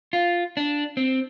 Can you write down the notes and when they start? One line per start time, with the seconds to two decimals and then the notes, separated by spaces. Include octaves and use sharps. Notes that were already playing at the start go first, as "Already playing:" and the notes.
0.13 F4
0.57 D4
0.97 C4